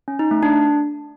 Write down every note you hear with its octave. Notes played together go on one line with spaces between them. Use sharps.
C#4
D#4
A3
D4